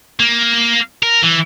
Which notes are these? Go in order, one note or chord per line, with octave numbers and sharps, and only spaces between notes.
A#3
A#4
E3